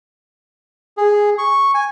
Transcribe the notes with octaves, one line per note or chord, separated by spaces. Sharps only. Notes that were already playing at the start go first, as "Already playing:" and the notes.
G#4
C#6
G#5